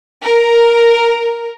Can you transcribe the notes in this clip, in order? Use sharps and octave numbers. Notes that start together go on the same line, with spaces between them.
A#4